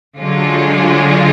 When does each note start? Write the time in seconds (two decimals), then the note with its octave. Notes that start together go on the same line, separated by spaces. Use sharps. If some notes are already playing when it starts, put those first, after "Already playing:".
0.19 D3 F#3 G#3 C#4 F4